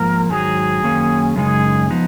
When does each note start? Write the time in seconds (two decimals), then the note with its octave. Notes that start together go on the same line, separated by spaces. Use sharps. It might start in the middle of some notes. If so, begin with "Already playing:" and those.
Already playing: G#2 F3 A#3 A#4
0.30 G#2 D#3 F#3 G#4
0.83 F#2 D#3 A#3 C#4
1.36 F#2 C#3 G#3 D#4 G#4
1.90 F3 B3 D#4